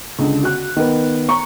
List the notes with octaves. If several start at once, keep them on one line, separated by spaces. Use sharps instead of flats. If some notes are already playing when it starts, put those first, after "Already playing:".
C#2 D3
F#4 F#6
D#3 B3
A#5 C#6